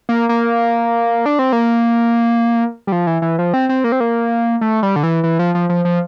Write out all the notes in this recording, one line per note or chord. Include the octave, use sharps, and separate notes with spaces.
A#3
A#3
D4
C4
A#3
G3
F3
E3
E3
F3
C4
C4
A#3
C4
A#3
A3
G3
D3
E3
E3
F3
F3
F3
F3